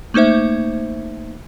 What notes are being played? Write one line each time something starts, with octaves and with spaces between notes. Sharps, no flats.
A3 A#3 D#4 C5 E5